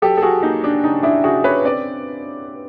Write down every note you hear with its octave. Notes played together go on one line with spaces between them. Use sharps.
F#3 G4 A4
A4
F#4 G#4
A#3 D#4
D4
C#3 D#4
D4 E4
C#3 F#4 G#4
B4 C#5
C4 D5